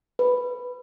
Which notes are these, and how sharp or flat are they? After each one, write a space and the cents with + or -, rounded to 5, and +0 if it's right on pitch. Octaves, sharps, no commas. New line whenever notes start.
B4 +0